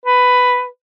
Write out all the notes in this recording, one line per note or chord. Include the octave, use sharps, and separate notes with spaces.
B4